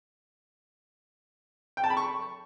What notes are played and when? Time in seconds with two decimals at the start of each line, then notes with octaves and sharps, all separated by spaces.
1.77 G5
1.84 A5
1.90 B5
1.97 C#6